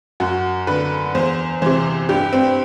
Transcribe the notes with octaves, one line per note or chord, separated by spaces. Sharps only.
F#2 F#4
D3 B4
E2 C5
C3 E3 C5
G2 G4
C4